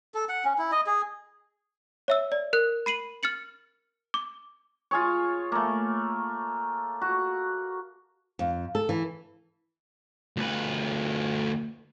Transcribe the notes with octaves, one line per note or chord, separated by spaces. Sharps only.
A4
F#5
C#4
E4
D#5
G#4
C#5 E5 E6
D5
A#4 F#6
B5 C7 D#7 F#7
F6 A6 C#7 F#7
D6
F4 G#4 C#5
A3 A#3
F#4
F2
A4
E3
D2 B4